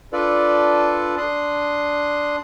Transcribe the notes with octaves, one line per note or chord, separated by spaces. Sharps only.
D4 F4 A4 B4 D5
D4 C6 D#6 F#6